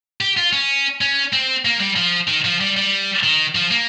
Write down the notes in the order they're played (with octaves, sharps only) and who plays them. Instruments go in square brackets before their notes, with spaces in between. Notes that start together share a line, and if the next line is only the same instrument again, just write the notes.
[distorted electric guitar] G4
F4
C#4
C#4
C4
A#3
G3
F3
D#3
F3
G3
G3
D#3
F3
A#3